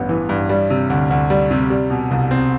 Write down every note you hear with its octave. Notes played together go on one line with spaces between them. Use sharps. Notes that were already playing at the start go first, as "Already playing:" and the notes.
Already playing: A1 G2 B3
E3
G2
G3
C3
D2
D2
G3
C3
G3
B2
C2
C4